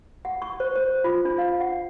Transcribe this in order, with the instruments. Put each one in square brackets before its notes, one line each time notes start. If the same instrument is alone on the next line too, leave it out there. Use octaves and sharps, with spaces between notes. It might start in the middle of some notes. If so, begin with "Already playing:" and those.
[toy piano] F#5
C#6
C5
C5
F4
D4
F5
F#5